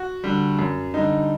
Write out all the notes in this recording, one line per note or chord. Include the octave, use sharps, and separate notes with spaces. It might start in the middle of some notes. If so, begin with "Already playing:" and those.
Already playing: F#4
D3 G3
F#2
D3 G3 D#4